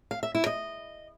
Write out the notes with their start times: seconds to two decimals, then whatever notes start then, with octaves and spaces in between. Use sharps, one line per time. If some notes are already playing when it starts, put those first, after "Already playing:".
0.11 F5
0.23 E5
0.35 E4
0.46 D#5